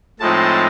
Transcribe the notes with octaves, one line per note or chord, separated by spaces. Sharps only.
A2 F3 G#3 C4 D#4 A5